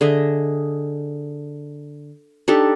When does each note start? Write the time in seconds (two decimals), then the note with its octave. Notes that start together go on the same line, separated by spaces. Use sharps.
0.01 D3 G#4 D#5 E5
2.48 D4 D#4 G4 A4